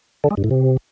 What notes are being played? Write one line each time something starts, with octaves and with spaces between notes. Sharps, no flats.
D3
G#3
G2
A2
C3